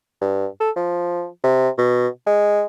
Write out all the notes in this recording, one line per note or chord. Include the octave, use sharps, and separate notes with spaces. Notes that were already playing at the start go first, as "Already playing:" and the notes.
G2
A4
F3
C3
B2
G#3